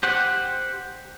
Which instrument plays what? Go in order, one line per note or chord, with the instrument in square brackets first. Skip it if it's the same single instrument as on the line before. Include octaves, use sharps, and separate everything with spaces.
[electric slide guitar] G4 C5 F#5